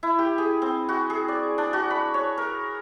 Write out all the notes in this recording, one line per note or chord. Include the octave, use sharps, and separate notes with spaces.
E4
G4
G#4
C4
F#4
G#4
D5
D4
F#4
B5
C#5
A#4